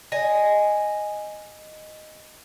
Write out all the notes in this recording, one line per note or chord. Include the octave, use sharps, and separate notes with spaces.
D#5 G#5